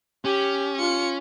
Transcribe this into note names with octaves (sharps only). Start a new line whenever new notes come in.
C#4 G4
F4 C#7